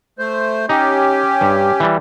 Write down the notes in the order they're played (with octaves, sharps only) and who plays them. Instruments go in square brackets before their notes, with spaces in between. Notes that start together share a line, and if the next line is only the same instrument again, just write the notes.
[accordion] A3 C5
[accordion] C#4 G4 [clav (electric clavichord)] D#4
[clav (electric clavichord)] G2
E3 G3